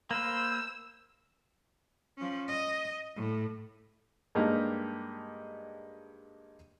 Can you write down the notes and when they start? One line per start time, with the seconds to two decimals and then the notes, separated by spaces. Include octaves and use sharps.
0.11 A#3 B4 C5 E6
2.17 F3 C#4
2.48 D#5
3.16 A2
4.35 G2 G#3 A#3 D4 D#4 G4